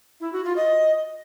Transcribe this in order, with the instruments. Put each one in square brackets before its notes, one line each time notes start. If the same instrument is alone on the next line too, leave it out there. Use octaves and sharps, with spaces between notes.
[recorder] E4
F#4
F4
D#5